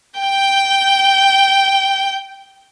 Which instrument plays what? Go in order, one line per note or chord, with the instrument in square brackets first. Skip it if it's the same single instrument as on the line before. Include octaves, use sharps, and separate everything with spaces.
[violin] G5 G6